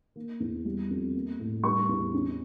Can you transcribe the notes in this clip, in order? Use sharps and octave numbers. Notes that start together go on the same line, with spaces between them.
A#3
E2
G3
F2
A#3
A2
G3 C#6
E2
C#4